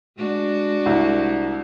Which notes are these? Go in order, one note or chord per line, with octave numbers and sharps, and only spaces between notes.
G#3 D4 F#4
C2